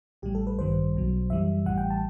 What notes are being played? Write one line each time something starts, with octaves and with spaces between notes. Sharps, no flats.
A1 A2 G3 G4
A4
B4
A1 G2 D#3 G3 C5
B1 B2 F#3
F#2 E3 G3 E5
A1 A2 E3 G3 F#5
G5
A5